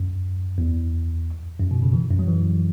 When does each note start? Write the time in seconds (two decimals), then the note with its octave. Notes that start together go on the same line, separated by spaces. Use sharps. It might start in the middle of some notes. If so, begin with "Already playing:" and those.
Already playing: F#2
0.58 E2
1.60 F#2
1.71 B2
1.82 C#3
1.93 E3
2.10 F#2
2.19 F#3
2.28 E3